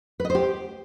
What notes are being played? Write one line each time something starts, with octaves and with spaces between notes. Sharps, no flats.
B4
D#5
C5
G4